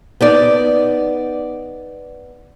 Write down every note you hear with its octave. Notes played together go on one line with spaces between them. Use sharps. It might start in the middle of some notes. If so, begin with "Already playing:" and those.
B3 D#4 D5